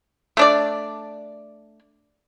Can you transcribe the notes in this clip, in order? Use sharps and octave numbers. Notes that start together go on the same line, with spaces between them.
A3 D4 D5